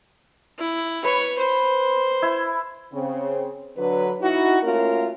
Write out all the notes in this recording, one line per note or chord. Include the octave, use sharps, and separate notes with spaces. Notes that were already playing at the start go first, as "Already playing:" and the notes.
E4
B4 C#5
C5
E4
C#3 C4
D3 F#3 B4
D#4 E4 F#4
A3 A#3 C#4 F4 F#4 A#4